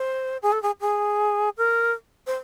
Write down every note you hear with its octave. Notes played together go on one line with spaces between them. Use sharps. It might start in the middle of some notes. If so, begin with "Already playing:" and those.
Already playing: C5
G#4
A4
G#4
G#4
A#4
C5